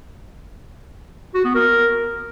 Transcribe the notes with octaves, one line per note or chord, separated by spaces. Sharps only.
F#4
B3
A#4